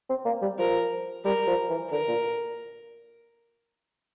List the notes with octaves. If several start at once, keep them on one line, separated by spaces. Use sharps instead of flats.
C4
A#3
G3
F3 A#4
G3 A#4
F3
E3
D3 A#4
A#2